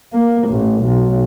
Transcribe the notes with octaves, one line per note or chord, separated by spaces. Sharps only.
A#3
A1
B1